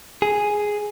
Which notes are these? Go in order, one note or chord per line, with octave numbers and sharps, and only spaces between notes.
G#4